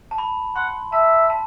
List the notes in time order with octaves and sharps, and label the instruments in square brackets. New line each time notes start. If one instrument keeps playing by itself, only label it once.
[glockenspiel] A5
B5
[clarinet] F#5 [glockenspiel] C6
[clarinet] E5 [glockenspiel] A5
[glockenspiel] A5